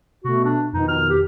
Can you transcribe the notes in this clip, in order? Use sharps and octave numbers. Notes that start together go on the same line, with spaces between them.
B2 A3 F#4
D4
F2 B2 D#3 D#4
F6
G4